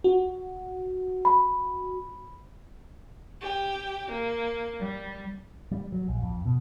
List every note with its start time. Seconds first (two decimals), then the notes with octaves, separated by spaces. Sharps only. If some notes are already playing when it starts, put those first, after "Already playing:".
0.04 F#4
1.25 B5
3.41 G4
4.10 A#3
4.81 G3
5.72 G3
5.92 F#3
6.08 A#1
6.22 F2
6.46 B2